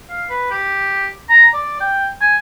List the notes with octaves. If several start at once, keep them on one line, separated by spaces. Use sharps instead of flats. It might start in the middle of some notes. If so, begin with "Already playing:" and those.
F5
B4
G4
A#5
D5
G5
G#5